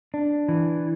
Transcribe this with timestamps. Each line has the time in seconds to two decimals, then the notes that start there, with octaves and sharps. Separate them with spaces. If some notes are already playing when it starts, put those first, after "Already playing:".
0.14 D4
0.48 E3